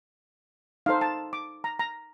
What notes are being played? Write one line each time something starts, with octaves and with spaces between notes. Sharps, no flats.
D#4 A4 C5 F5
A5
D6
A#5
A#5